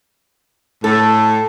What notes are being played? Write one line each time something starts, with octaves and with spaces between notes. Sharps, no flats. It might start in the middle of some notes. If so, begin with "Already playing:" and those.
A2 A4